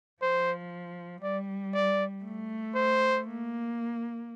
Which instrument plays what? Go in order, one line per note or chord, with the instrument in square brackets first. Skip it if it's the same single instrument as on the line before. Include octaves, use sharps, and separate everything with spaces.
[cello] F3 [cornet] C5
[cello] G3 [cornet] D5
[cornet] D5
[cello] A3
[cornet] C5
[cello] A#3